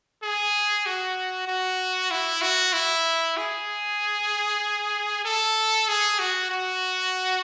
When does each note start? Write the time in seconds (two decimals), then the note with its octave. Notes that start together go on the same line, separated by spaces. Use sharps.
0.23 G#4
0.86 F#4
1.48 F#4
2.11 E4
2.42 F#4
2.73 E4
3.37 G#4
5.25 A4
5.88 G#4
6.19 F#4
6.50 F#4